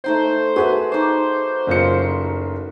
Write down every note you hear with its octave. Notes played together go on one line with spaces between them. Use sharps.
A3 D#4 C5 G5
F#4 G#4 B4 E5
D#4 C5 D6
F#1 F4 C#7